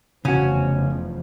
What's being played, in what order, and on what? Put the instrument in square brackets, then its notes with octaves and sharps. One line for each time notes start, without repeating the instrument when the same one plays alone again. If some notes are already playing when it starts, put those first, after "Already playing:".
[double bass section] F1 E2 F3 [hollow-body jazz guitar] C#3 F#4 [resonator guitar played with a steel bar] C#4